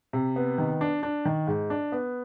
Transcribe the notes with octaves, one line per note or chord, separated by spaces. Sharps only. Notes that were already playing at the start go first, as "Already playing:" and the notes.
C3
B3
D#3
D4
D4
D#3
G#2
D4
B3